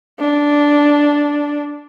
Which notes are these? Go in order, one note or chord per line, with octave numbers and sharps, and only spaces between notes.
D4